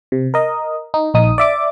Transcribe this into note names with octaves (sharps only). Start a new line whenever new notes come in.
C3
A#4 D#5
D#4
A#1 D#4 D#6
D5 E5 D6